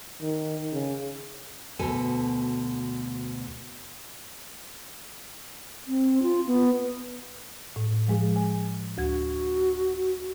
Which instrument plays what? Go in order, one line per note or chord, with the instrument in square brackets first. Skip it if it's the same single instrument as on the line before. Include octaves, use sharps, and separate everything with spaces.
[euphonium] D#3
C#3
[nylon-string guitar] D2 B2 A4 G#5
[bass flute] C4
F4
B3
[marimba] A2
F3 G#3 G#4
G#5
[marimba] D2 G#6 [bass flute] F#4